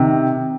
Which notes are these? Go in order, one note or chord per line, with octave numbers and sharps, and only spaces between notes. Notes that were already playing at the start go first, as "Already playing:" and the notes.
Already playing: C3 D#3